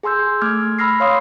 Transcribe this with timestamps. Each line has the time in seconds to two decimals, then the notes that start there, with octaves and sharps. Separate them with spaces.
0.03 G#4 G#5 C6 E6 G6
0.42 A3 D6 F6 G#6
0.79 B5 E6 F6 A#6 C7
1.00 C#5 F5 C6 D#6